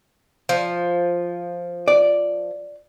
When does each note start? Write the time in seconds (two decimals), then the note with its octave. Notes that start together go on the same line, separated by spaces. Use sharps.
0.49 F3
1.88 D5